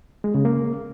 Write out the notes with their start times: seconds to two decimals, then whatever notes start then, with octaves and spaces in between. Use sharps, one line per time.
0.24 G#3
0.35 C#3
0.45 A#3